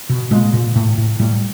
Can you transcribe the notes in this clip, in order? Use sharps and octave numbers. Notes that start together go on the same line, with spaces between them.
B2
A#2 G#3
A#2
A2
A2
A2 G3